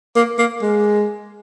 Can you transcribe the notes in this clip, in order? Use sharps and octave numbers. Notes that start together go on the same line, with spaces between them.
A#3
A#3
G#3